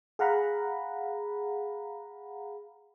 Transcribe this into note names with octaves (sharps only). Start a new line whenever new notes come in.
G#4 F5 F#5 A#5 B5